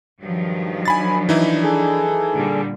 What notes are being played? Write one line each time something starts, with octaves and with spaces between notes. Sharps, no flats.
G2 D#3 F3 F#3
D4 G#5 B5 A6
E3 D#4 E4
G#4 A4
A#2 D3 G3 D4